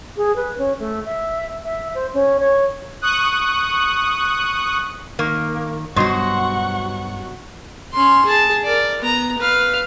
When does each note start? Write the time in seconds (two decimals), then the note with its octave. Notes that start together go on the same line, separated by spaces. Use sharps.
0.17 G#4
0.36 B4
0.58 C#4
0.79 A3
1.05 E5
1.64 E5
1.95 C5
2.13 C#4
2.39 C#5
3.01 C#6 D#6 F#6
5.19 D#3 A#3
5.96 G2 B2 F#3 F#4 C5 F#5 C#6
7.93 C#4 C6
8.25 G#4 A5
8.65 A#4 D5
8.99 B3 A#5
9.38 B4 F5